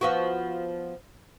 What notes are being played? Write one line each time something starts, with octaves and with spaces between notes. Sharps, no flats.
F3 B3 F#4